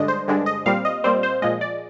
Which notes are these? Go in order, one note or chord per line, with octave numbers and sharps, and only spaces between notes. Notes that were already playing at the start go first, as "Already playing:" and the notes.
Already playing: G2 D3 G#3 D4 D#5
C5
G2 D3 G#3 D4
D#5
A#2 G3 C4 F5
D#5
A#2 G3 C4 C5
C5
A#2 F3 G#3 D#5
D5